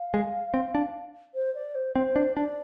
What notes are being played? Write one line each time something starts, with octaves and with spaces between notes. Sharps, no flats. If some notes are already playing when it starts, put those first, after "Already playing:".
Already playing: F5
G#3
C4
D4
C5
D5
C5
C4 C5
D4
D4 D5